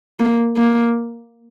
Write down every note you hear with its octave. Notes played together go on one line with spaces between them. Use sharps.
A#3
A#3